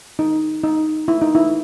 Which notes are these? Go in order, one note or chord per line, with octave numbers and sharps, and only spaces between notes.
D#4
D#4
E4
D#4
E4